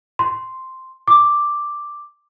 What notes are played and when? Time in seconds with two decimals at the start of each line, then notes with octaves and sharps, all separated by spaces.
0.19 C6
1.08 D6